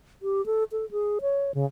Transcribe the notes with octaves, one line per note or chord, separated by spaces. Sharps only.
G4
A4
A4
G#4
C#5
C#3